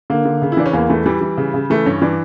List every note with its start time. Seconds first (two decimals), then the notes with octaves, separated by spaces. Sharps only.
0.10 D3 A#3
0.25 D3
0.42 C#3
0.52 E4
0.57 E3 D4
0.66 C#4
0.73 E2 A#3
0.90 E3 A3
1.06 E3 G3
1.21 E3
1.37 C#3
1.54 C#3
1.70 E3 A3
1.86 G2 C#4
2.02 E3 D4